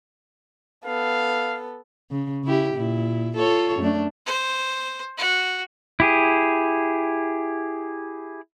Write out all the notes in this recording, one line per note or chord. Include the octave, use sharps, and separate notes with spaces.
B3 A4 F5
C#3
C#3 E4 G4
A#2 E4
F4 A4 C#5
F#2 A3 D4
C5
F#4
E4 G4 G#4